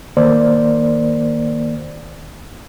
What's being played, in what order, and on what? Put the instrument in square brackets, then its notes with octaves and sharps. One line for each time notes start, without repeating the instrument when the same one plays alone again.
[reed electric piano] D#3 A#3 C5 D5